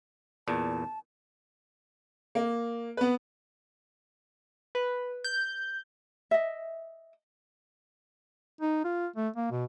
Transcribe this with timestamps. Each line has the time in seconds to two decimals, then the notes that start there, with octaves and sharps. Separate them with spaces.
0.48 E2 A#2 A5
2.35 A#3
2.97 B3 B4
4.75 B4
5.24 G6
6.31 D#5 E5
8.61 D#4
8.84 F4
9.16 A3
9.36 A#3
9.51 B2